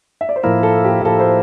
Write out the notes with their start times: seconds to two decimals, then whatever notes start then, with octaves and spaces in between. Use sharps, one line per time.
0.21 E5
0.29 D5
0.36 C5
0.43 A2 F3 A#3 E4 A#4
0.63 A4
0.84 G4
1.05 A2 F3 A#3 E4 A4
1.20 C5